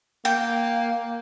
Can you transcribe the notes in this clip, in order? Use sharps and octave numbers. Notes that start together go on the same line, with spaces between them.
A#3 G5